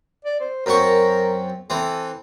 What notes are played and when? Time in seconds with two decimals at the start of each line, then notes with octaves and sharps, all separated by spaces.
0.25 D5
0.41 C5
0.66 F#2 C4 A#4 C#6
1.70 E3 C4 A4